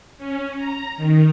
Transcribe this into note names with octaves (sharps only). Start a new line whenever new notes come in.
C#4
A#5
D#3